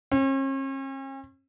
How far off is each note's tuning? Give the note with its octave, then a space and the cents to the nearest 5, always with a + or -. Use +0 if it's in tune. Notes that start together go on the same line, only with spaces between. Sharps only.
C#4 -45